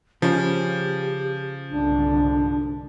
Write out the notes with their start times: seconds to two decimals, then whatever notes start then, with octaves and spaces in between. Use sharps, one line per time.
0.22 C#3 F3 C#4 G4
1.70 C2 G#2 D3 D4